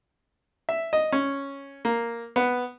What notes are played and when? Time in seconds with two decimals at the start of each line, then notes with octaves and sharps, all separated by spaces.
0.69 E5
0.93 D#5
1.12 C#4
1.85 A#3
2.36 B3